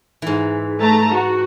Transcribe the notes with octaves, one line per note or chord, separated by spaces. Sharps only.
G#2 E3
A3 A5 A#5
F#4